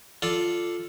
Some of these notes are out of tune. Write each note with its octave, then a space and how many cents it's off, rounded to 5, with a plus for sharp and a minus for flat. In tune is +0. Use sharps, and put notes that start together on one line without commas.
F4 +0 A4 +0 D5 +0